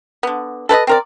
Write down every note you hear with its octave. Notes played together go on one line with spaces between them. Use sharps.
D3 B3
A4 B4 C5 D#5
C4 A#4 D5